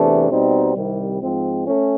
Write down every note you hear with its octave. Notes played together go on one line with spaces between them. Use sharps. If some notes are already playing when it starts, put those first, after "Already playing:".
Already playing: E2 C3 E3 A3 D4
B2 G3 C4 D#4
C2 C3 D#3 G3
G#2 F3 G#3 C4
A3 C#4